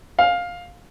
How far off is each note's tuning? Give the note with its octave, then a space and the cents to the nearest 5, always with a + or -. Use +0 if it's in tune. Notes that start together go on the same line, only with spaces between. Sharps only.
F5 +15